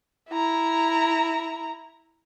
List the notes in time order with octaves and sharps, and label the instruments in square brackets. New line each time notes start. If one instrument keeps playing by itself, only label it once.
[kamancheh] E4 A#5